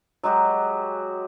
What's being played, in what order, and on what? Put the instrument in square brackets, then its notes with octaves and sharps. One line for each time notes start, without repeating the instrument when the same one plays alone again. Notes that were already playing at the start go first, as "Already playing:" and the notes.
[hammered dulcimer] F#3 G#3 F#4 G4